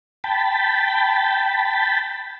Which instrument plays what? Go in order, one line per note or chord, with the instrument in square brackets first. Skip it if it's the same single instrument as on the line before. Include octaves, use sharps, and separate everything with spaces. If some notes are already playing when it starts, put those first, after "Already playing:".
[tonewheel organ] G5 A5 B5